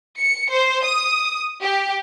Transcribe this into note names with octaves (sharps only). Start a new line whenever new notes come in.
C#7
C5
D#6
G4